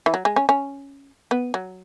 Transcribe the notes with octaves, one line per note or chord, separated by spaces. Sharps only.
E3
F#3
G#3
C#4
C#4
B3
F#3